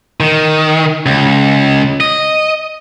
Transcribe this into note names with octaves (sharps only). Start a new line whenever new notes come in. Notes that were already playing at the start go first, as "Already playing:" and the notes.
D#3
C#2
D#5